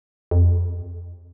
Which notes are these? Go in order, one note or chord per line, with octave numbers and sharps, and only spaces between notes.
F2